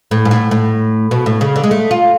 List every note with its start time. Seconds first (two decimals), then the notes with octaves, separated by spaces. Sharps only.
0.11 A2
0.25 G#2
0.31 A2
0.51 A2
1.11 B2
1.26 A2
1.41 C#3
1.56 D3
1.64 G#3
1.71 A3
1.91 F4